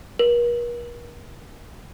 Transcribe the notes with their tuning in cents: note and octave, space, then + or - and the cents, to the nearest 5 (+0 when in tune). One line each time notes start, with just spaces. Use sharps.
A#4 +45